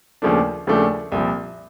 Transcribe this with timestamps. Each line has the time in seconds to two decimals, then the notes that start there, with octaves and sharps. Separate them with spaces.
0.22 D#2 C#3 F3 A3 D4
0.67 D#2 C#3 F3 A3 D4
1.12 C2 A#2 F3